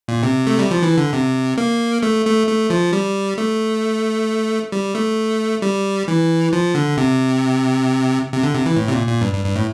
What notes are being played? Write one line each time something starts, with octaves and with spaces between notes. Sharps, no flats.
A#2
C3
A3
G3
F3
E3
D3
C3
A#3
A3
A3
A3
F3
G3
A3
G3
A3
G3
E3
F3
D3
C3
C3
D3
C3
E3
A2
C3
A#2
A#2
G2
G2
G2
A2